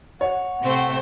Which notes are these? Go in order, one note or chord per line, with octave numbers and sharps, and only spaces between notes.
C#5 F#5
C3 A3 C4 C5